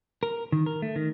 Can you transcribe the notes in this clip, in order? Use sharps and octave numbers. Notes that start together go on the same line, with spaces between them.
A#4
D#3
A#4
A3
D#3